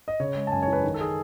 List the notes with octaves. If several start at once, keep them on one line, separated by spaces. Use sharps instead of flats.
D#5
C#3 C#5
G#3
A5
F#2 G#5
C#5
E3
B4
D#3
A4
G#4